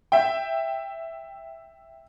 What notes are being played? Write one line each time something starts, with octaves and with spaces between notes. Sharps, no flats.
E5 G5